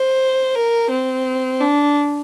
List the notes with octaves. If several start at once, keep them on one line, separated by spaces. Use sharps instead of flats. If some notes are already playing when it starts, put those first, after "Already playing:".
Already playing: C5
A#4
C4
D4